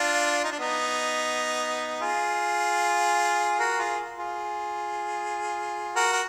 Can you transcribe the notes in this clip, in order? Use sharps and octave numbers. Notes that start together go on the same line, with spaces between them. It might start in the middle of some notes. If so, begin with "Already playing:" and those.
Already playing: D4 F4
D#4
D4
B3 D#4
F4 G#4
F#4 A#4
F4 G#4
F4 G#4
F#4 A#4
A#4